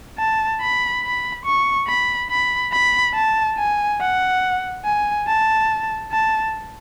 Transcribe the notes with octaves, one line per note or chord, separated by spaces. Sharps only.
A5
B5
B5
C#6
B5
B5
B5
A5
G#5
F#5
G#5
A5
A5